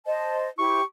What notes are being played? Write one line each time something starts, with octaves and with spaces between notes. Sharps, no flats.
C5 D#5 A5
E4 G4 C5 C#6